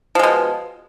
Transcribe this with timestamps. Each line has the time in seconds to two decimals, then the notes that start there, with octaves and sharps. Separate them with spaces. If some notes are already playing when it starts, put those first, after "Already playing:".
0.15 F3
0.19 G#3
0.23 B2